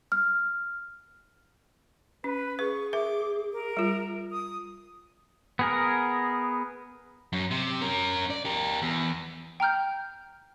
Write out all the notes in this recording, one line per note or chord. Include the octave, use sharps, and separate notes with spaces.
F6
C#4 B4
G#4 B4 C#6
A#4 E5 D6
A#4
G3 F4
D#6
B3 G#4 A#4
F#2
C3
C#4 A#4
D5
G4 A#4
E2
G5 A#5 F6 G6